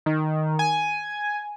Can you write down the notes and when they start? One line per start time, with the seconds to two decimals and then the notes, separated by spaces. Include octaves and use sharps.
0.06 D#3
0.59 G#5